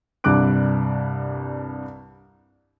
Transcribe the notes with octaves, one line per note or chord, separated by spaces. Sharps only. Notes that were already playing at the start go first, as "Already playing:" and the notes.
C2 G2 G3 D6 F#6 D7